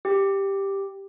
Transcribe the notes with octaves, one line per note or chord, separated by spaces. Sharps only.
G4